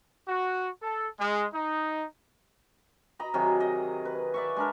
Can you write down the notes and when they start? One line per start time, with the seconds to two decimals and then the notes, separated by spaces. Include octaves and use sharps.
0.27 F#4
0.82 A4
1.19 G#3
1.53 D#4
3.19 D#5 A#5 B5
3.34 C3 D#3 F#3 G#4
3.60 D#5
4.05 B4
4.34 D5 E5 C#6
4.56 G#3 D4 A#4